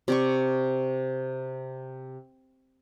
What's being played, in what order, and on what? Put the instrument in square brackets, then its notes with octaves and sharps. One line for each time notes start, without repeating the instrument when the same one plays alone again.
[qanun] C3 D5 C#6